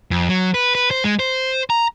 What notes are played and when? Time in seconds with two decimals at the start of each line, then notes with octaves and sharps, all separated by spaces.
0.11 F2
0.29 F#3
0.54 B4
0.75 B4
0.91 C5
1.04 G#3
1.19 C5
1.70 A#5